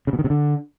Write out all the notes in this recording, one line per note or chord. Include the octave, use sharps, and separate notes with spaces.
C#3
B2
D#3
C3
D3